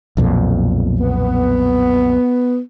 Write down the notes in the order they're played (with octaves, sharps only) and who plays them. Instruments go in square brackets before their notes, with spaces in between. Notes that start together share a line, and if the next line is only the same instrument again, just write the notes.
[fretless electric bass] B1 F2 A#2
[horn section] B3